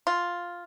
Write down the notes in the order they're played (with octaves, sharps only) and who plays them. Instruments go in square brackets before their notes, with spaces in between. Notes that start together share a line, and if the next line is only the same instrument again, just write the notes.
[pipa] F4